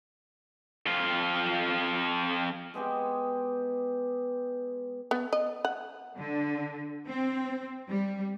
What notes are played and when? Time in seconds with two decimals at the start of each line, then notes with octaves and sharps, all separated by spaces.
0.86 F2 F4
2.74 G#3 B3 G4 G#4
5.11 B3
5.33 D#5
5.65 F#5
6.17 D3
7.08 C4
7.89 G3